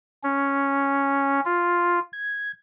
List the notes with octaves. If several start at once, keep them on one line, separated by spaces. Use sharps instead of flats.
C#4
F4
G#6